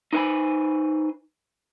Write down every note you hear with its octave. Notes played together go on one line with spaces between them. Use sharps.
D#4 E4 B4 C5 G#5 B5